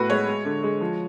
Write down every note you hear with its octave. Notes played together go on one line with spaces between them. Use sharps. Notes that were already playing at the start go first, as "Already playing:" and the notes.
Already playing: A2 B3 F#4 B4
G#3 C#5
G#3
D3
G#3
F3